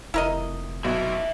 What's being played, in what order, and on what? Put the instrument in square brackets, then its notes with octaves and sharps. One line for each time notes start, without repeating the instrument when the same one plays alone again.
[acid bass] F1 [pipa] E4 A#4 D#5
[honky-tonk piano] B1 [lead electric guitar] E5 G#5